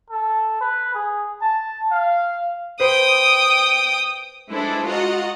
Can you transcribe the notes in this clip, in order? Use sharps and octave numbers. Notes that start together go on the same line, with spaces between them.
A4
B4
G#4
A5
F5
B4 C5 G5 D#6
G#3 D4 E4 A4 B4 C5
F4 F#4 D#5 F#5 A#5